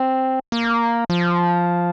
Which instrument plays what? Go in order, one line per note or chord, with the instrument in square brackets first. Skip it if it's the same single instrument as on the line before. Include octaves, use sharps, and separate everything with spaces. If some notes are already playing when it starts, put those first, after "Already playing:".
Already playing: [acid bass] C4
A#3
F3